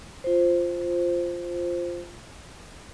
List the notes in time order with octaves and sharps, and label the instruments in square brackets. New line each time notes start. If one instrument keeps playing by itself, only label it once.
[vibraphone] F4 C5